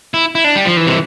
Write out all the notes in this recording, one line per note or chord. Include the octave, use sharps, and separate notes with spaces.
E4
E4
D4
G3
F3
E3
C3